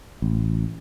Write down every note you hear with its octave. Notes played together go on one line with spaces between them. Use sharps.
A1